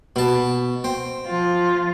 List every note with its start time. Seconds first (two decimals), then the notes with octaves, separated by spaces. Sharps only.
0.16 B2 A5
0.84 C4
1.27 F3 F4